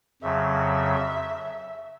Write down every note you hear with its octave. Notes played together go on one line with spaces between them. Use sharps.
F2 C#3 F#3 E5